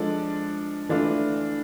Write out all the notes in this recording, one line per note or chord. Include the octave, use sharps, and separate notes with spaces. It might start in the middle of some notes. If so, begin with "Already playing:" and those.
Already playing: F3 G#3 D4 A4 D5
E3 A3 D4 F4